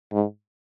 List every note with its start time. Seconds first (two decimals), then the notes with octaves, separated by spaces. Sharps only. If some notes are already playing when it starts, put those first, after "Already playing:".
0.12 G#2